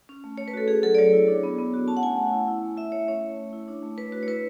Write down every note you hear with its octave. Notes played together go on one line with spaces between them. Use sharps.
C#4
A3
A3 C#5
B4
F#4 A4
C#4 G#4
F#3 A4
D5
F#3 C#5
E4
D4
B3
B3
F#4
C#4 A5
F#5
A3 G#5
A3
E4
E4
A3
E4 E5
A3 C#5
C#4 C#5
A3
A3
E4
D4
A3
A3 B4
F#4 B4
C#5
E4 B4